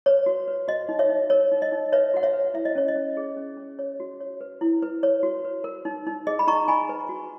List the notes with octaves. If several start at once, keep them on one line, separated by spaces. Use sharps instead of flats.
B4 C#5
F#4
B4
F#4 D#5
D#4
C#5 E5
D#4
A#4 C#5
D#4
D#5
D#4
B4 C#5 E5
F#4 F#5
C#5 E5
B4
E4 E5
D#5
C#4 C#5
D#5
C#4
G#4
C#4
C#4
C#5
F#4
C#5
B4
E4
B4
B4 C#5
F#4
B4
A#4
D#4
D#4
G#4 D#5
B5
D#4 A#5 C#6
D#4 G#5 B5
B4
F#4